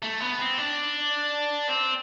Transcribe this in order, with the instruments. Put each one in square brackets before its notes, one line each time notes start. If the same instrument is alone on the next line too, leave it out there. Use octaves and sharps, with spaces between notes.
[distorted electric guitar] A3
B3
C4
D4
C4